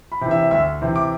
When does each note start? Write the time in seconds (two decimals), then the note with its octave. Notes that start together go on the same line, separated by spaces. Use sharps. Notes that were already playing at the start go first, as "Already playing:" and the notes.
0.12 B5
0.21 C3 E3
0.31 E5
0.51 D2 E5
0.82 C3 E3
0.96 D6